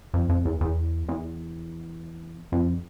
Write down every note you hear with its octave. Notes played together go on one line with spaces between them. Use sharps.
F2
F2
E2
E2
E2
F2